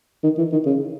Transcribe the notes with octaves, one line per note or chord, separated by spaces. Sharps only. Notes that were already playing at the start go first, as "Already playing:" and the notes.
D#3
E3
D#3
C#3